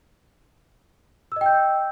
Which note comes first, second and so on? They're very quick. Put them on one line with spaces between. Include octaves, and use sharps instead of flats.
E6 D#5 G5 G6